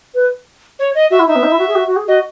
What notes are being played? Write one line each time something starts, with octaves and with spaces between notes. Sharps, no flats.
B4
C#5
D#5
F#4 E5
E4
D#4 E5
B3
D#4
E4
F#4
G#4
F#4
F#4
G#4
F#4 D#5